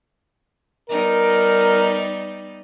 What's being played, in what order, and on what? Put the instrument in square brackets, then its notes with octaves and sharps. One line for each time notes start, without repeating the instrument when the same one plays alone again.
[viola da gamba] G3 B3 D#4 [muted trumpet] A#4